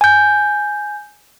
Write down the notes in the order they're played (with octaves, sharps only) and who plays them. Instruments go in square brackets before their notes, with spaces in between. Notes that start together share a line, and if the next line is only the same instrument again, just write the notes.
[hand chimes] G#5 G6